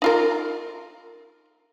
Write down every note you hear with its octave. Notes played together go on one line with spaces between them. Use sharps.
D#4 F4 A#4